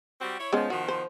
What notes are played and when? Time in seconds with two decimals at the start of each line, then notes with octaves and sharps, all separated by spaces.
0.20 G3 C4 F#4
0.38 E4 C#5
0.53 D#3 F3 G#3 B3 C#4
0.70 B2 D#3 F3 F#4
0.88 C5